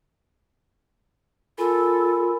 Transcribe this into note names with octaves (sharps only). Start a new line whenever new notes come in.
F4 A4 A#4 G#5 B5